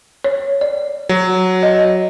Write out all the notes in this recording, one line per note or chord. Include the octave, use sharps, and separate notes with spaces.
C#5
D5
F#3
D#5